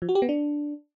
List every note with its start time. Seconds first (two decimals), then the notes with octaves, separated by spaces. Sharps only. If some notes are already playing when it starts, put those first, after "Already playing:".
0.02 F3
0.09 F#4
0.15 G4
0.22 B3
0.29 D4